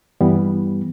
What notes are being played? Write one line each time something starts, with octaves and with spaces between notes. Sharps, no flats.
G2 E3 G3 B3